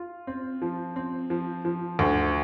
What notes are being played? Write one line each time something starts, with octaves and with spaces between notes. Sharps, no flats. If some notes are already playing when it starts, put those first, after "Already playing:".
Already playing: F4
C4
F3
C4
F3
F3
D2